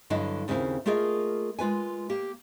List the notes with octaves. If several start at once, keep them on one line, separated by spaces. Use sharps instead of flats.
G2 D3 F#3 E4 D#5 F5
D#2 C#3 C4 E4 F5
A3 A#3 F4 G#4 A#4 D#5
G#3 F4 B4 G#5
A#3 G4